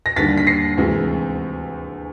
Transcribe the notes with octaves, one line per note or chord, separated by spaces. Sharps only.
A#6
D#2 D3 G3 A6 B6
B6
A#6 C7
D2 C3 E3 G#3